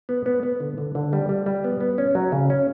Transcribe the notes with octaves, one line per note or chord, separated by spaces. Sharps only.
B3
B3
B3
D3
D3
D3
G3
G3
G3
B3
B3
C#4
F#3
C#3
C#4